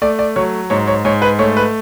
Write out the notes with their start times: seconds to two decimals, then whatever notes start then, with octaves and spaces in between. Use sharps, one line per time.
0.02 A3 D5
0.19 D5
0.36 F#3 C#5
0.70 G#2 C#5
0.88 C#5
1.05 G#2 C#5
1.22 B4
1.39 A3 C#5
1.57 B4